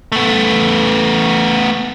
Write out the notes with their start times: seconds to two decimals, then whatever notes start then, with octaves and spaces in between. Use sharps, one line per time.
0.12 A3 B3